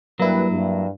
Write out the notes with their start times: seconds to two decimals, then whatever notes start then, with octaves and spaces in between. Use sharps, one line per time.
0.20 G2 F#3 G3 A#3 E4 B4
0.51 G2